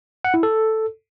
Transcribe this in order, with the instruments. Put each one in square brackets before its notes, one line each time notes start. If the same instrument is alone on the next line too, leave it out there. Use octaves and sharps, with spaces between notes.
[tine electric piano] F#5
E4
A4